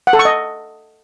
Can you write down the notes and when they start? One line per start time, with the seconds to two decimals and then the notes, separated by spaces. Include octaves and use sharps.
0.07 F#5
0.13 A4
0.19 C#6
0.25 D#5